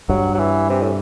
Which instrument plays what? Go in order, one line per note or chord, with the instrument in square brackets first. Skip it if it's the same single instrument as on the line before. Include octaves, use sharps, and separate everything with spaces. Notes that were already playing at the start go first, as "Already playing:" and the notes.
[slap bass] G2 [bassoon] F#3
[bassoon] F#3
E3
C3
A2